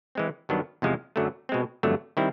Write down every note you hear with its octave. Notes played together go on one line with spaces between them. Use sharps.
E3 G#3 C4
G2 D#3 F#3 B3 D4
E2 C3 F3 G#3
F#2 D3 F#3 A3
B2 G#3 C4
G1 F2 D3 F#3 A3
D#3 G3 C4 E4